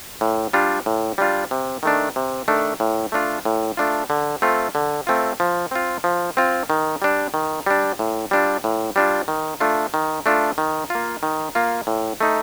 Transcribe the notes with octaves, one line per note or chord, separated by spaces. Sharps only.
A2
G3 D4 F4
A2
G3 D4 F4
C3
D#3 A3 D4
C3
D#3 A3 D4
A2
A3 D4 F4
A2
A3 D4 F4
D3
A3 C4 F4
D3
A3 C4 F4
F3
C4 F4
F3
C4 F4
D#3
G3 D4
D#3
G3 D4
A2
G3 D4 F4
A2
G3 D4 F4
D#3
A3 D4 F4
D#3
A3 D4 F4
D#3
A#3 F4
D#3
A#3 F4
A2
A3 D#4